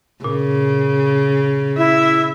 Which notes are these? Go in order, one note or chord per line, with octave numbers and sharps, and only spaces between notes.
A#2 C#3
E4 E5